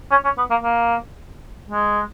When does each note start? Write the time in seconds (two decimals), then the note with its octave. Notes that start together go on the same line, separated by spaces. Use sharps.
0.11 C#4
0.24 C#4
0.37 B3
0.50 A#3
0.63 A#3
1.69 G#3